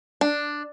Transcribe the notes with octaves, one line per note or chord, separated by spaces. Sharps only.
D4